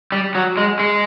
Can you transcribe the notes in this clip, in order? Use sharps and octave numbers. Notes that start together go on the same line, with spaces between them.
G3
F#3
G#3
G#3